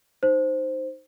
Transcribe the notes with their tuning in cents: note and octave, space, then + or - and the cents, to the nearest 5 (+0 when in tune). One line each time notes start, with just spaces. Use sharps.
D#4 +0 C5 +0